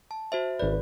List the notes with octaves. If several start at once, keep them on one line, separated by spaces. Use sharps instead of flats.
A5
F#4 C5 E5
G#1 B4 D5